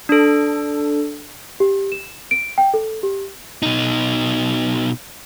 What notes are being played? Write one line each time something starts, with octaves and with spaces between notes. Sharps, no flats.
D4 A4
G4
E7
D7
G5
A4
G4
B2 D#4